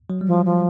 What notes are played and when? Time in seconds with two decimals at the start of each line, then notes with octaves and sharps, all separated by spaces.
0.10 F#3
0.21 G3
0.27 F3
0.33 F#3
0.45 F3